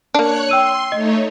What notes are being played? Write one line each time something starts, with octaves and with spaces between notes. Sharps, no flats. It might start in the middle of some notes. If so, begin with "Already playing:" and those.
A#3 D4 C#5 F#6 C#7
G5 C6 E6 D#7
A3 D#4 C#5 D#5